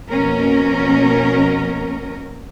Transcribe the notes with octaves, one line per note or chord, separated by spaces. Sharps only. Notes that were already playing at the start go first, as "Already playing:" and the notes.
F2 B2 A#3 C#4 A#4